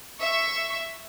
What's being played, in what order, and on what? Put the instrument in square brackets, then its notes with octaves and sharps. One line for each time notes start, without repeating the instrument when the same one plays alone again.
[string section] E5 C#6